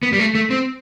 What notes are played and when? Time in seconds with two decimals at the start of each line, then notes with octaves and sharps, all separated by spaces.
0.03 B3
0.13 G3
0.19 A3
0.35 A3
0.51 C4